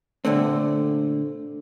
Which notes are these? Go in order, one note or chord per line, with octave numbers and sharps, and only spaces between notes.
A#2 D3 A3 C4